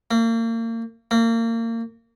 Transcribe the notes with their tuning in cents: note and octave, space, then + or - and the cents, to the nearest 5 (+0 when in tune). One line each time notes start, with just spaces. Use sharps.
A#3 -35
A#3 -30